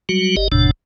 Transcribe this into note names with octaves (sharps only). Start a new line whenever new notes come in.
F#3 G3 F#4
G1 G4 D#5
F#1 E2 A2 C3 D4